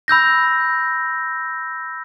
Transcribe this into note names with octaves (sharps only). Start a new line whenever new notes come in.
B5 E6 G6 A#6